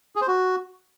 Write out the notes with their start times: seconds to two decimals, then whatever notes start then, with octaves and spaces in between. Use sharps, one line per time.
0.16 G#4
0.22 C5
0.27 F#4